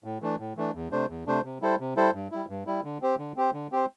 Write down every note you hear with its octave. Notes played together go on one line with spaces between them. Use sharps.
A2
E3 A3 D4
A2
E3 A3 D4
E2
C3 A3 D4 C5
E2
C3 A3 D4 C5
C3
G3 E4 A4 C5
C3
G3 E4 A4 C5
G2
G3 E4
G2
G3 E4
D3
C4 G4 C5
D3
C4 G4 C5
D3
C4 G4 C5